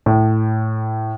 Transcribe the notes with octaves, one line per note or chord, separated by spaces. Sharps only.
A2